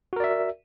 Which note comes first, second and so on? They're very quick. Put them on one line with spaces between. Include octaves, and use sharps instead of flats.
F#4 A#4 D5 E5